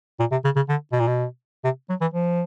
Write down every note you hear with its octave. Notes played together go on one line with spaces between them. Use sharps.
A#2
C3
C#3
C#3
D3
B2
A#2
B2
C3
F#3
E3
F3